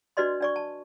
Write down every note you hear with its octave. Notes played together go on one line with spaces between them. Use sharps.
D4 F#4 B4 D5 D#5 C6
D4 D5 C#6
A5